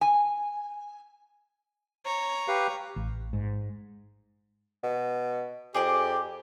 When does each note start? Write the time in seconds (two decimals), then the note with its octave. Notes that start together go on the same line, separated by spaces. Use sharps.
0.01 G#5
2.05 C#5 A#5
2.48 G4 B4 F5
2.96 A1
3.33 G#2
4.83 B2
5.74 F2 G4 G#4 D5 D6